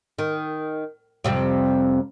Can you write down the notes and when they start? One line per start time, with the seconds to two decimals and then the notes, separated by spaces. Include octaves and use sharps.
0.19 D#3
1.24 F2 C3 G3